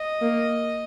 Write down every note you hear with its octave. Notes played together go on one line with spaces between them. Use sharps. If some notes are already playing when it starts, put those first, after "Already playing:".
Already playing: D#5
A#3